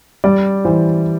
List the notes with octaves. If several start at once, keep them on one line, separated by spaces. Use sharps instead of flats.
G3 D5
E3 C5